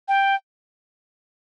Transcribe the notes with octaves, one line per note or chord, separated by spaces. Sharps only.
G5